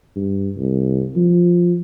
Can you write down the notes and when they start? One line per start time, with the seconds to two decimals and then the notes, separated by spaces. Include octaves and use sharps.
0.16 G2
0.57 C2
1.16 F3